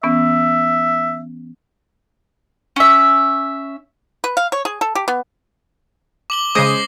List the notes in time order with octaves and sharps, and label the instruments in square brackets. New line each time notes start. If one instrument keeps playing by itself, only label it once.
[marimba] E3 B3 C#4 [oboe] E5
[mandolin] C#4 E5
[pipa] B4
F5
C#5
G#4
A4
G4
B3
[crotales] D6 F#7 G7
[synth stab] C#3 D#6 [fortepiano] G#3 C#4 C5 [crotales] D6 A#6 C7